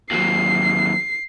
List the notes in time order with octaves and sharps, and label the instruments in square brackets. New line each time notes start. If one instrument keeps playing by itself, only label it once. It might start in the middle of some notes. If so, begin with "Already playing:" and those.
[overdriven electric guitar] D#2 F#3 [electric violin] C7